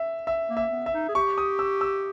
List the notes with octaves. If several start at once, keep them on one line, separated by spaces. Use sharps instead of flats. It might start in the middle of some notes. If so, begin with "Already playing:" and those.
Already playing: E5
E5
A#3
E5
B3
E5
D#4
G#4
G4 C#6
D#6
E6
E6